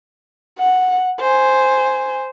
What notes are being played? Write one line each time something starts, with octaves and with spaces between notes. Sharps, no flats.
F#5
C5 G#5